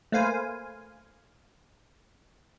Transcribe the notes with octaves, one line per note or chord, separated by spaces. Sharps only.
A3 A#3 B4 C5 F5 G#5